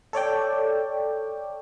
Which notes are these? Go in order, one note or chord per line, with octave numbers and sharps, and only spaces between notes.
A4 C#5 D5 G5